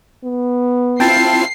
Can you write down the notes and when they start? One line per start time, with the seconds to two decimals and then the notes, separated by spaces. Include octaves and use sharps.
0.24 B3
1.00 C4 E4 F4 G5 A5 C7